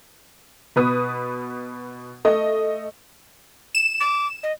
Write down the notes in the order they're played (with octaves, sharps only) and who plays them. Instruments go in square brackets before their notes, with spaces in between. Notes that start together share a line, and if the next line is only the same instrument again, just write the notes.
[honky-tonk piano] B2 B4 D#6
A3 D#5
[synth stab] E7
[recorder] D6
D#5